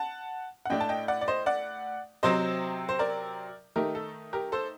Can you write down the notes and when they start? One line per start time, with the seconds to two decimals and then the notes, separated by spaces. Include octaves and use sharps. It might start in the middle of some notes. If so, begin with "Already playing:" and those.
Already playing: F#5 A5
0.65 F#5
0.70 A2 A3 D4 D#5 G5
0.80 A5
0.89 D#5 G5
1.08 D5 F#5
1.21 D5
1.28 C5 D#5
1.46 D5 F#5
2.23 C3 F#3 C4 C5 D#5
2.89 C5
2.99 A#4 D5
3.76 D#3 A3 D#4 G4 A#4
3.95 A4
4.33 G4 A#4
4.52 A4 C5